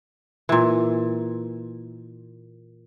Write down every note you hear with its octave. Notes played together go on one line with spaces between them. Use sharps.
A#2 E3